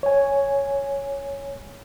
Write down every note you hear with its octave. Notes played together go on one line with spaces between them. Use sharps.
C#5 G#5